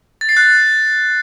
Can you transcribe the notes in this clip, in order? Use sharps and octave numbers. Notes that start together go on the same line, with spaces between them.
A6
C7
F#6